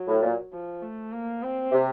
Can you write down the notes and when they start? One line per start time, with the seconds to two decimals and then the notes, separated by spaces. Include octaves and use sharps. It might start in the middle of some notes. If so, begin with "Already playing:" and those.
Already playing: F#3
0.08 A2
0.23 A#2
0.53 F3
0.83 A3
1.13 A#3
1.42 C4
1.72 C3